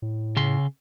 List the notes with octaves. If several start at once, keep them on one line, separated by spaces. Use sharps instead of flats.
A2
C#3 C6